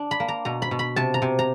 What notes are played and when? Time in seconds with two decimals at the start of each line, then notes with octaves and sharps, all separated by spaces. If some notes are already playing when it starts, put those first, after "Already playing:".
Already playing: D4
0.11 B5
0.20 A#3
0.28 A#5
0.45 B2 A#5
0.62 B5
0.71 B2
0.79 B5
0.96 C3 A5
1.14 A#5
1.22 C3
1.39 A#5